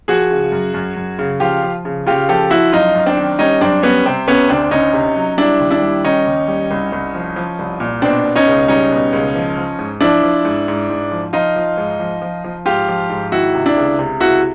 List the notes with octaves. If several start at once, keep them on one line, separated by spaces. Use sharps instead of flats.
F3 F#4 G#4
C#3
F#2
F#2
F#2
C#3
F3 F4 G4
F3
C#3
C#3 F4 G4
F3 G4 A4
F3 E4 F#4
F#2 D#4 F4
F#2
C4 D4
D#3
G3 C#4 D#4
F#2 C4 D4
G3 B3 C#4
C3 C4
C3 B3 C#4
D2 C4 D4
D2 C#4 D#4
C3
F#3
G3 D4 E4
D#2
D4 E4
G3
D#3 C#4 D#4
D#2
G3
C2
C2
F3
F3
C2
A#2
B2 C4 D4
B2
C#4 D#4
C#2
G3 C#4 D#4
B2
C#2
F3
F3
G#2
F3 D4 E4
F3
G#2
G#2
G#2
F3
F3 D#4 F4
F3
G#2
F3
F3
F3
G#2 F4 G4
F3
G#2
D#3 E4 F#4
C3
D4 E4
C#2
C3
C#2 E4 F#4